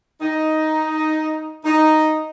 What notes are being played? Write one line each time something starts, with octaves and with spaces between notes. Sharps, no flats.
D#4
D#4